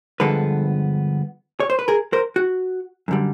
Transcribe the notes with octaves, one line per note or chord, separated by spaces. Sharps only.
G2 D3 F3 G#3 B3 A4 B4
C#5
C5
B4
G#4 A#4
A#4 C5
F#4
F#2 D3 G3